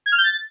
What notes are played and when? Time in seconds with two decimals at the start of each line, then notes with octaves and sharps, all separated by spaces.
0.06 G#6
0.12 F6
0.18 G6
0.24 A6